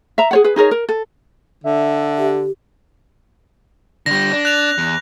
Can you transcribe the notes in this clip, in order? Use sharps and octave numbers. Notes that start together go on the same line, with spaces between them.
E5 A#5
G#4 C#5 F#5
G#4 B4
D#4 G#4 A#4 C#5
A#4
A4
D3 E5
G4
D3 G3 A#6
D4
F#6 F7
E2